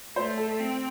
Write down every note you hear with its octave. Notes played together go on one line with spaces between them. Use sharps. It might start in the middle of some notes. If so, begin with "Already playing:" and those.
A3 C5
A4
C4